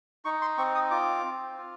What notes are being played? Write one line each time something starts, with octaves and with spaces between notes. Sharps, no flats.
D#4 C#6
C6
C4 C#6
D#6
F4 D6
C4
F4